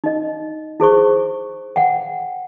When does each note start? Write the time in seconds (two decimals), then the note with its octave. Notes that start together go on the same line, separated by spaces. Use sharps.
0.04 D#4 D#5
0.80 E4 G#4 C5 C#6
1.76 F#5 G5